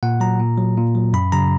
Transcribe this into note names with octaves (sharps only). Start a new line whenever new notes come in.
A#2 F#5
F#3 A#5
A#2
F#3
A#2
F#3
F#2 B5
C#3 F#3 A#5